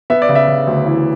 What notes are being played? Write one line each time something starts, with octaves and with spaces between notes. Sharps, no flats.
B3 E5
D5
C#3
E5
C#3
D2
E3